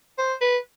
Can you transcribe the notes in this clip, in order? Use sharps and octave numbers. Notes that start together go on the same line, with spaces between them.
C5
B4